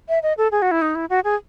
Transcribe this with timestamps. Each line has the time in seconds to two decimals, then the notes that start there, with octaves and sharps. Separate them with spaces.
0.09 E5
0.23 D#5
0.38 A4
0.52 G#4
0.62 F#4
0.71 E4
0.82 D#4
0.95 E4
1.10 F#4
1.24 G#4